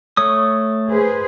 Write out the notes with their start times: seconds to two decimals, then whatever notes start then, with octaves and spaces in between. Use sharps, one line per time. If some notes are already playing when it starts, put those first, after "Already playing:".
0.17 A3 C#5 D#6
0.90 G#4 B4 C5